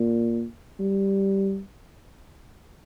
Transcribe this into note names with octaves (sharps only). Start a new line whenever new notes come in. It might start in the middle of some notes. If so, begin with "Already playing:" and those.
Already playing: A#2
G3